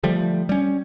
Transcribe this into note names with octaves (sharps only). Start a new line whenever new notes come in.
D3 F3 G3 A3
G3 C#4